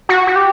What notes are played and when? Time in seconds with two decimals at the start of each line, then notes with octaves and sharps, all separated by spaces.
0.09 F#4
0.27 F#4
0.36 G4